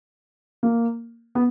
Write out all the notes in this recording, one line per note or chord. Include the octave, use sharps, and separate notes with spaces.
A#3
B3